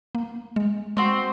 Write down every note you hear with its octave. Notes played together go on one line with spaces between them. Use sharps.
A#3
G#3
G#3 C4 F#4 C5